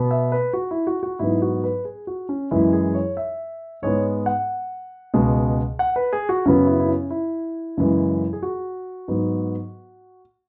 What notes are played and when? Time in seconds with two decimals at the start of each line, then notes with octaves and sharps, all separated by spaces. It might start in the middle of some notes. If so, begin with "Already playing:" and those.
Already playing: B2 B3
0.11 E5
0.32 B4
0.53 F#4
0.71 E4
0.87 F#4
1.03 F#4
1.19 G#2 F#3 B3 E4
1.42 F#4
1.64 B4
1.85 G#4
2.07 F#4
2.29 C#4
2.51 F#2 E3 G#3 E4
2.73 G#4
2.95 C#5
3.17 E5
3.82 G#2 G#3 B3 C#5
4.26 F#5
5.14 C#2 B2 G#3
5.79 F#5
5.96 B4
6.13 G#4
6.29 F#4
6.45 F#2 C#3 F#3 B3 C#4
6.67 E4
6.80 E4
6.89 C#4
7.11 E4
7.77 F#2 C#3 E3 G#3
8.33 G#4
8.42 F#4
9.08 G#2 F#3 B3